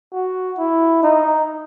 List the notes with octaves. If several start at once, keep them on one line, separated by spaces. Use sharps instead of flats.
F#4
E4
D#4